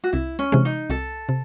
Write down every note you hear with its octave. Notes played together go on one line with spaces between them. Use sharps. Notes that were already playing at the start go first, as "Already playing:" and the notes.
F#4
C2 E4
C#4
C3 E3 G#3
D#4
C2 A4
C3